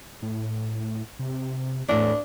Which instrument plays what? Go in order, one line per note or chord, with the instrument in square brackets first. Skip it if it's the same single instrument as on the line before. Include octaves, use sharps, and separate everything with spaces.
[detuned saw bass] A2
C3
[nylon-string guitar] E2 A2 [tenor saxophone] D4